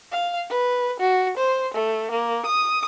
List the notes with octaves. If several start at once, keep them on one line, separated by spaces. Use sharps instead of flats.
F5
B4
F#4
C5
A3
A#3
D#6